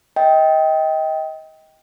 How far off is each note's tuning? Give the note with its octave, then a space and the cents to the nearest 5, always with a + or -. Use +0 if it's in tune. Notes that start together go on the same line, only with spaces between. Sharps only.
D#5 +25 G5 +0